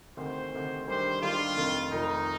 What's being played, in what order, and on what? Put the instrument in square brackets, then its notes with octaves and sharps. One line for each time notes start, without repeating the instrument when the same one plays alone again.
[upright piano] D2 C3 D#3 [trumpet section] C5
[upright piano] D2 C3 D#3
[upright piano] D#3 G3 D4 G4 [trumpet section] C5
[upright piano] D#3 G3 D4 G4 [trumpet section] F4
[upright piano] F1 F2 D#3
[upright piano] F1 F2 D#3 [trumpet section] D#4